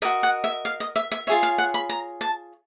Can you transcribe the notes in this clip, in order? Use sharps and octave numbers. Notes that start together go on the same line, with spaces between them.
F#4 A#4 D#5 E5
F#5
E5
F5
D#5
E5
E5
F4 G#4 C#5 E5
F5
F#5
B5
A#5
A5